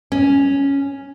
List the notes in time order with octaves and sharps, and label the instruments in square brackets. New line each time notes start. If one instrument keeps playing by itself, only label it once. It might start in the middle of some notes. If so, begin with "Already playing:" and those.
[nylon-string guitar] C#4